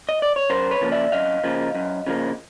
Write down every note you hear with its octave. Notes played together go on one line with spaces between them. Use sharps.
D#5
D5
C#5
F#2 A#4 C5
B4 C#5
C#3 F3 A#3
D5 E5
F#2 D#5 F5
C#3 F3 A#3
F#2
C#3 F3 A#3